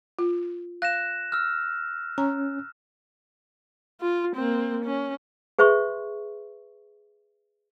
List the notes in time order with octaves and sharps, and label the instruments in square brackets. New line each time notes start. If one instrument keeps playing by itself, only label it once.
[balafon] F4
[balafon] F5 [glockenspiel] F#6 A#6 E7
[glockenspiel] E6 F6
[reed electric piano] C#4 [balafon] A#5
[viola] F4
A#3 C4
C#4
[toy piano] G#4 B4 E5 C6 C#6